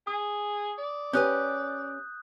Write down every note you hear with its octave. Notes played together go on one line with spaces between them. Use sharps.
G#4 D#6
D5
C#4 G4 B4 D#6 F#6 G6